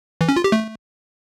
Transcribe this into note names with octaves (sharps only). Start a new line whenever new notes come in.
E3
C#4
F4
G4
A3